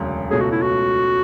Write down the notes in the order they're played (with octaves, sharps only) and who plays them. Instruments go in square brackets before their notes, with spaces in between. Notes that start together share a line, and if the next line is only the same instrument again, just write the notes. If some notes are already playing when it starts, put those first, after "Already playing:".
Already playing: [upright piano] E1 D2 C#3 F#3
[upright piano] C#2 B2 A3 C#4 [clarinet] G#4
[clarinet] F#4
E4
F#4